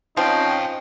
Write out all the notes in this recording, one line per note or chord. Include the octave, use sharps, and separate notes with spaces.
F3 C4 C#4 D#4 F5 G5